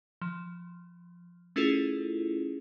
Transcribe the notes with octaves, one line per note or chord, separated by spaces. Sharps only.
F3
A3 C#4 E4 F4 G#4 A4